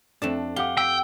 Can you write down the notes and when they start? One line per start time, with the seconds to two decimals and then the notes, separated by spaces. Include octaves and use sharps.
0.22 F2 A3 D4 A5
0.56 G4 F5 F#5 D6 G7
0.77 G5 E6